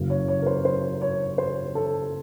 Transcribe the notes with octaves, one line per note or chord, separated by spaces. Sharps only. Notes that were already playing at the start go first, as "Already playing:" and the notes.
Already playing: F#1 F#2 C#3
C#5
C#5
A#4
C5
C5
C#5
C5
A4